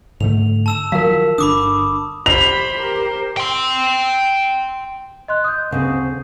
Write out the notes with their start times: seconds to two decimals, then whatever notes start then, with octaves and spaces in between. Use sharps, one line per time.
0.20 G#2 D3 A3 F7
0.66 A5 E6 E7
0.92 D#3 F3 F#3 A#4 F5
1.38 G1 D3 D4 B5 D6 D#6
2.26 G4 C5 B5 F7
2.73 G4 A#4
3.37 G5 C6
5.28 D#5 C6 F#6
5.44 D#6 G6
5.71 D2 C#3 C4